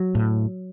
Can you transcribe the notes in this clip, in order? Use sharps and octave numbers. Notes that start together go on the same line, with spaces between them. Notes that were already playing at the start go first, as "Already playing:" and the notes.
Already playing: F#3
A2